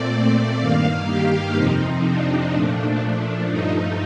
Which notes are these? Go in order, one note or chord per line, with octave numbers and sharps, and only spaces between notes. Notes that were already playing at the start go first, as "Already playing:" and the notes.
Already playing: A#2 A3 C4 D5
D5
G2 D#3 A#3 F5
G4
F2 C3 F3 C4 D#4
D4
A#2 F3 A3
G2 F3 A3 D#4